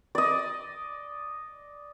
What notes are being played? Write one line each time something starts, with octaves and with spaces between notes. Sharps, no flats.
D5 D#5